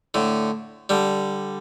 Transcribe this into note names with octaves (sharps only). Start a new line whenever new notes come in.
A2 D3
D3 G3